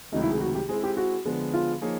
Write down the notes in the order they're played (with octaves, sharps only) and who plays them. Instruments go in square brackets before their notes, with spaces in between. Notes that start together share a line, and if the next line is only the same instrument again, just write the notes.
[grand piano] C#2 C3 D#3 F#3 A3 [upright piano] D#4
[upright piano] E4
G#4
F#4
G4
[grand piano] G#3 C4 E4 [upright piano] G#4
[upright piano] G4
F#4
[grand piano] D3 F3 G#3 B3
[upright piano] F4
[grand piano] F3 A#3 D#4 G#4 C#5